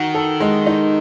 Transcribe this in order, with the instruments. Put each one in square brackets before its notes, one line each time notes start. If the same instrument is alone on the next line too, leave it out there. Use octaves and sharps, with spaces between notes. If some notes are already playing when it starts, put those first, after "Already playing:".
Already playing: [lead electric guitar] D#3 [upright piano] F#4
[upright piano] A4
G#3
D#4